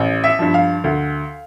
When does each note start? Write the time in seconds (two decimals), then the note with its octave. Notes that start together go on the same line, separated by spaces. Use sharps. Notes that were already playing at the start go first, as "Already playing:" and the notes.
Already playing: A1
0.24 E5
0.39 G2 F3
0.54 F5
0.84 D2